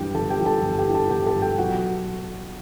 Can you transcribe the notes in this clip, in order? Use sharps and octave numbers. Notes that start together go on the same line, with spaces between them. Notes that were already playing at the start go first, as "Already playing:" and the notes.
Already playing: G2 E3 G4 G5
G1 A4 A5
G4 G5
G2 E3
A4 A5
G1
G4 G5
G2 E3
A4 A5
G1 G4 G5
A4 A5
G2 E3
G4 G5
B1 F#4 F#5